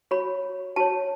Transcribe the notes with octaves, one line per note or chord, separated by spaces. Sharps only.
F#4 C#5 B5
F#4 C#5 A5